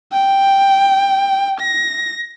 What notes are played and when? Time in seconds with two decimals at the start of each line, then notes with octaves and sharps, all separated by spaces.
0.12 G5
1.60 A#6